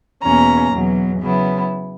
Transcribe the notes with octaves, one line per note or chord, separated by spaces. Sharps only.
E2 B2 A#3 C#4 A#5
E2 B2 F#3
C#3 F#3 B3 E4